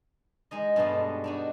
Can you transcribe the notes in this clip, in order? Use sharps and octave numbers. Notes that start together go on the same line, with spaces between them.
G#3 D#4 D#5
G2 B2 G#3 A3 B3 D4
D4 D#4 F#4